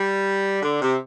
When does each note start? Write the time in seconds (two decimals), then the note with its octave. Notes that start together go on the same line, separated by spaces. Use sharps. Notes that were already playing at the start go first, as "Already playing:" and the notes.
Already playing: G3
0.62 D3
0.82 C3